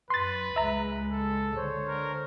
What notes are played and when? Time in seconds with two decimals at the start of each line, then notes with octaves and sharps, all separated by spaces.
0.10 F#2 B4 C6 A6
0.56 C#2 G#3 E5 A#5
1.12 A4
1.56 D3 C5 C#5
1.88 A#4